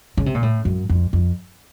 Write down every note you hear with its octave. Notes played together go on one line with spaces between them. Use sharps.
C#3
C3
A#2
A2
F#2
F2
F2